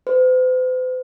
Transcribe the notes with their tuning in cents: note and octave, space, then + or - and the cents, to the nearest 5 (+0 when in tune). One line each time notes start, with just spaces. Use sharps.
C5 -45